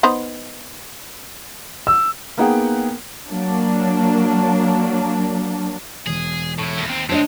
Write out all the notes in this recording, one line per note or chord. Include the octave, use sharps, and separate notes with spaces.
B3 D#4 C5
E6
A#3 B3 D#4 G#4 F#5 G5
F#3 A#3 D4
E1 G#4
A2 E4
D#2
C4
D2 G#3 C4 D4 C#5 D#5